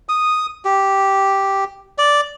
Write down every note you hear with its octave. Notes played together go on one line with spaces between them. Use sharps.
D#6
G4
D5